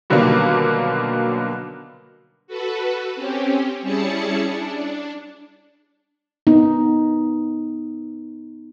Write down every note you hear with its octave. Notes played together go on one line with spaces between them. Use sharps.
B2 D3 D#3 F#3 G3 A#3
F#4 A4 B4
C4 C#4 G4
G3 C#4 E4 G#4 A5 C#7
D4
B3 D#4